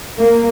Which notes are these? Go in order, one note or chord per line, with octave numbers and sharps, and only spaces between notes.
A#3